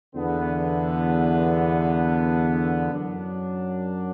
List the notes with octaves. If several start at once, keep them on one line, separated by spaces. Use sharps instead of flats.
E2 D3 B3
F#2 F#3 D4